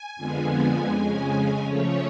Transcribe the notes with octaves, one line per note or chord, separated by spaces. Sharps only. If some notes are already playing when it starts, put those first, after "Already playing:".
Already playing: G#5
F2 D3 F3 G#3 B3
F2 C#3 G#3 C#4
C#3 F3 A3 C#4 C#5